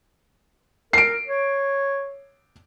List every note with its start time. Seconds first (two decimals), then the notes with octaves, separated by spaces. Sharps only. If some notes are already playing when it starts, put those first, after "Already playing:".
0.93 A#4 C7 D7
1.26 C#5